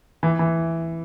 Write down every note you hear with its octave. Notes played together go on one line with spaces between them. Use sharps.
E3
E3